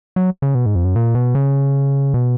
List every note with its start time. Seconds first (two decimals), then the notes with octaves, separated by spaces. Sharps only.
0.16 F#3
0.42 C#3
0.55 B2
0.66 G#2
0.75 F2
0.85 F#2
0.96 A#2
1.15 B2
1.35 C#3
2.14 B2